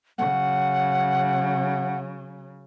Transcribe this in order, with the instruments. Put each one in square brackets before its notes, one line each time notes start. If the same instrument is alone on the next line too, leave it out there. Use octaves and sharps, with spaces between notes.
[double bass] C#3 F#3 [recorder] F#5